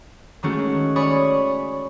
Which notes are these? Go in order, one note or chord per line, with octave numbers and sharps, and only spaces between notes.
D#3 G#3 A3 C#4 F#4
C#5 D5 G#5 B5 C#6 D#6